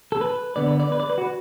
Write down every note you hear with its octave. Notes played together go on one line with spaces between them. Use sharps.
A4
B4
D3 B3 D5
B4
D5
B4
D5
B4
F#4